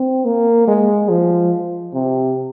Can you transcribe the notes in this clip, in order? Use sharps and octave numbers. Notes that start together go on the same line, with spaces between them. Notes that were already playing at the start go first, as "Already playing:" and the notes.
Already playing: C4
A#3
G#3
F3
C3